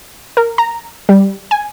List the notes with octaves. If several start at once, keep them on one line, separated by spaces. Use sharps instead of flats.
A#4
A#5
G3
G#5